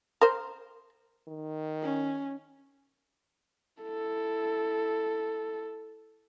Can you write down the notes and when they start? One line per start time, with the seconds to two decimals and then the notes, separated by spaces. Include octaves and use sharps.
0.21 A#4 C5
1.28 D#3
1.83 C#4
3.83 E4 A4